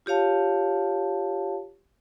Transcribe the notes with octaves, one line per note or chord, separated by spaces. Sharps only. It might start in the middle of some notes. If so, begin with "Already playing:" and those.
F4 G4 C#5 F5 A5